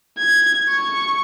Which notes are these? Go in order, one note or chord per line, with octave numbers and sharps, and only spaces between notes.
G#6
C#6